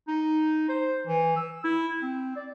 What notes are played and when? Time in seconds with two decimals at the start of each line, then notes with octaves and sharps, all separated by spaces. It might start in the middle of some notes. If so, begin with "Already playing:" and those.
0.08 D#4
0.69 C5
1.07 E3
1.36 E6
1.64 E4
2.02 C4
2.36 D5